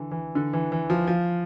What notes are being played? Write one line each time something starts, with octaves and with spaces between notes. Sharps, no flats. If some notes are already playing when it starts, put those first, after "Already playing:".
Already playing: D3 E3
E3
D3
E3
E3
F3
F3